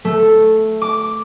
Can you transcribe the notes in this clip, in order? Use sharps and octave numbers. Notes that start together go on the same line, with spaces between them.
A3
D6